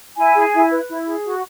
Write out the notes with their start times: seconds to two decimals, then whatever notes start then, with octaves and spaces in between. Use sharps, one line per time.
0.17 E4 G#5
0.35 G#4
0.53 E4
0.71 B4
0.89 E4
1.07 G#4
1.25 F#4